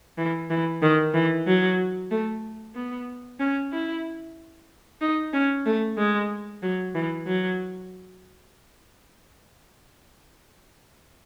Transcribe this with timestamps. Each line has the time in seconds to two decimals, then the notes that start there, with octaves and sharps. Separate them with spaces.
0.18 E3
0.50 E3
0.82 D#3
1.14 E3
1.47 F#3
2.11 A3
2.76 B3
3.40 C#4
3.72 E4
5.01 D#4
5.34 C#4
5.66 A3
5.98 G#3
6.63 F#3
6.95 E3
7.27 F#3